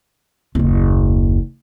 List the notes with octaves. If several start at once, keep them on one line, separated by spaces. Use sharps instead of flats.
F#1 D#2